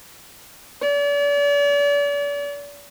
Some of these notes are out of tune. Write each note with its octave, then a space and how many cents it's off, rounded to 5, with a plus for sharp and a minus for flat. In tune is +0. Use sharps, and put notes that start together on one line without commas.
D5 -40